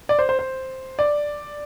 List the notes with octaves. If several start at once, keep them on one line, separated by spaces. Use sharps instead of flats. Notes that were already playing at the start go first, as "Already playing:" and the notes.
D5
C5
C5
C5
D5